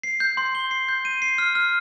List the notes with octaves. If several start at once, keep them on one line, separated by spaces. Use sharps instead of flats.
C7
G6
C6
G7
C7
G6
D#7
C7
F6
F6